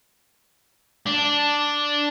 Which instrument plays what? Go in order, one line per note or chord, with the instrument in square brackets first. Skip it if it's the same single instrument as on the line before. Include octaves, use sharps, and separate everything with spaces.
[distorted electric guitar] D4